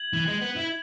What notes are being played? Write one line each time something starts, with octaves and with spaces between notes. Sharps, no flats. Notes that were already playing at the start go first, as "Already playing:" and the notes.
Already playing: G#6 F#7
E3
G#3
B3
E4